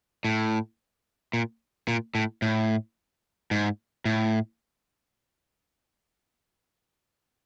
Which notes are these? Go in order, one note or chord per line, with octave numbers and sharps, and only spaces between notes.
A2
A#2
A#2
A2
A2
G#2
A2